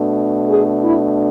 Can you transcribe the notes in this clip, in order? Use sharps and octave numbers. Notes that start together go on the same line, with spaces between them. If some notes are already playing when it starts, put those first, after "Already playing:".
Already playing: B2 A3 D4
G#4
E4